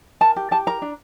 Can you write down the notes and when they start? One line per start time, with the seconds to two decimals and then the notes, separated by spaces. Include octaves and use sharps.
0.21 A#4 A5
0.36 G4
0.51 G4 A5
0.67 A#4 A#5
0.82 D4